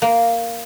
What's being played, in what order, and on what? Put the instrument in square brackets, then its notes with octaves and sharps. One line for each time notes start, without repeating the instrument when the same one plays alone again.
[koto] A#3